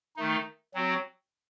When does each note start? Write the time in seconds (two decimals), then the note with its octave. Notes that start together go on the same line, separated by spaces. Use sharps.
0.16 D#3 A3 D#4
0.74 F#3 C4 F#4